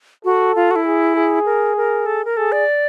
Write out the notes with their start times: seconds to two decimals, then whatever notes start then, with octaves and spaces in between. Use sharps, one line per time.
0.25 F#4 A4
0.56 F4
0.71 F#4
0.76 E4
0.86 G#4
1.16 G#4
1.46 A#4
1.77 A#4
2.06 A4
2.25 A#4
2.37 G#4 A4
2.52 D5